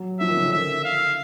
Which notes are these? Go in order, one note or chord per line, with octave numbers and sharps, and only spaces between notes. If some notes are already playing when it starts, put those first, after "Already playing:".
Already playing: F#3
F3 E5
D#3
C#3
D3
E5
F5